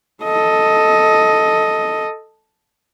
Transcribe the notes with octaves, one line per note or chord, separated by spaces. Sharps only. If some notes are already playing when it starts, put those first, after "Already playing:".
A4 D#5